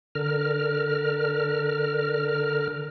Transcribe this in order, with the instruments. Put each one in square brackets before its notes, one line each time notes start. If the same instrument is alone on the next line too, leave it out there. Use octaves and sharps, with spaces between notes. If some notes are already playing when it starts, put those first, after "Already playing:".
[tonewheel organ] D3 A#4 F6